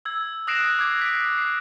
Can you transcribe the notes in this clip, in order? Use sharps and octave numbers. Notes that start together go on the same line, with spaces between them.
E6 G#6
D#6 F#6 A#6 C7 D7 E7
D6 G#6 C7
B6 D7
C7